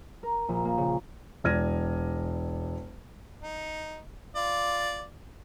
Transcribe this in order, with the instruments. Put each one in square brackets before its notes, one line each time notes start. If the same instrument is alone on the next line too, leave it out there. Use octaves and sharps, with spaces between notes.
[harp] A#4
A#1
A#3
C#3
[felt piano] E1 D5 F6 G#6 A#6 D#7
[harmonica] D#4
F4 D5